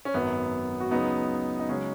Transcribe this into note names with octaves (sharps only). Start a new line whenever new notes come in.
C#4
G#1 F#2 F#3 B3
F#4
C#2 C#3 F#3 B3 D#4
D#4
C#3 F#3 G#3 C#4